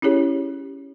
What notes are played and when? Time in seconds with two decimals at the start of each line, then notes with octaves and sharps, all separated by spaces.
0.02 C#4 E4 G4 G#4 C#5